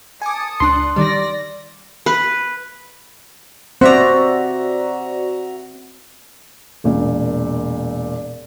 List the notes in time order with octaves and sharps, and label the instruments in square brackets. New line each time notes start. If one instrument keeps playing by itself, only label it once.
[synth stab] G#5 D6 [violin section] A5 D#6 C#7
[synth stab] C#2 D4 F#6 [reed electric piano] C6
[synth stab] D#3 G3 [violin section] D5 A#6
[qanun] B4
[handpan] C4 [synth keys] F#4 E5 A#5 [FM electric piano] C5 D5
[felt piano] E1 A#2